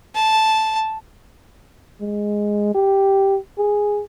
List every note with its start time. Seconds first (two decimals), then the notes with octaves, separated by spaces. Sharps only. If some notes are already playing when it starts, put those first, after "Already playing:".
0.15 A5
2.01 G#3
2.75 G4
3.58 G#4